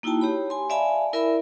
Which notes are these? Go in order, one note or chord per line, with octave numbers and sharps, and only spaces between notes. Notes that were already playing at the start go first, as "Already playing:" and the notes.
A#3 D#4 E4 F#4 G5 A5
G4 C#5 B5
G#5 C6
D5 E5 F5 G#5 A5 B5
E4 A#4 D5 E5 B5